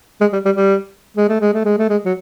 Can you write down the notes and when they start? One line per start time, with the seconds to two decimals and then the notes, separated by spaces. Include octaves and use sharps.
0.21 G#3
0.33 G3
0.45 G3
0.56 G3
1.17 G#3
1.29 A3
1.41 G#3
1.54 A3
1.65 G#3
1.78 A3
1.90 G#3
2.05 F#3